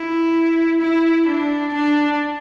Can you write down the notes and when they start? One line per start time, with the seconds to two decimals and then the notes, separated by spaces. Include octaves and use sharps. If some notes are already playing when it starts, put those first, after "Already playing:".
Already playing: E4
0.81 E4
1.27 D4
1.73 D4